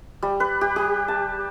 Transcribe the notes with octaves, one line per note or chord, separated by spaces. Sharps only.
G3
B4
G4
G4
A5